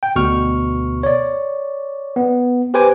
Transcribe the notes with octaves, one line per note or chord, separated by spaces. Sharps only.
G5
D2 B2 C#6 F6
C#5 D5
B3
G4 B4 C5 G#5 D6